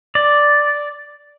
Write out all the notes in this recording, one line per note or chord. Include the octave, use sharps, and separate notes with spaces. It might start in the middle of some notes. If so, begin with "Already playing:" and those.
D5